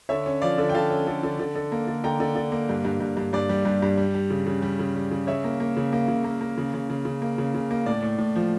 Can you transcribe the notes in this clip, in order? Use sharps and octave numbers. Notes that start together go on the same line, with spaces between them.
D3 C#5 E5
C#4
F3 D5 F5
D3
G5
D3 F5 A5
C#4
D3
D3
D3
D3
A#3
D3
D3 G5 A#5
D3
D3
A#3
G2
G2
G2
G2
G2 D5
G3
G2
G2
G3
G3
C#3
C#3
G3
C#3
G3
C#3
C#3 C#5 E5
A#3
A#3
C#3
A#3
C#3
A#3
A#3
C#3
C#3
C#3
C#3
A#3
C#3
C#3
A#3
A2 D5
A2
A2
F3